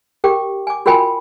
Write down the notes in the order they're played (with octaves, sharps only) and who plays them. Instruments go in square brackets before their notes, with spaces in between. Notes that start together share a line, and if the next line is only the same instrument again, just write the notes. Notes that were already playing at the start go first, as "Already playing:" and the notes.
[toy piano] G4 A#4 G5 D6
G#5 D6
F4 F#4 A#4 G5 G#5 B5